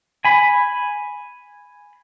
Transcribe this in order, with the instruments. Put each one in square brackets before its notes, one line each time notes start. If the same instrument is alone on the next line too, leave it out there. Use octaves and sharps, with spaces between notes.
[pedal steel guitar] G#5 B5